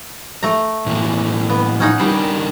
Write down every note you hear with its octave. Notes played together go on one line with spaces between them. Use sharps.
A3 A#5
A2 E3 A#3
B3
C#4 D#4 F#5
G3 D4 D#4 A#4